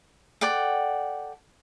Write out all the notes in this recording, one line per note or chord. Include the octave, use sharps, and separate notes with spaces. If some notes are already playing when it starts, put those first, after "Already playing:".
A4 D5 F#5 G5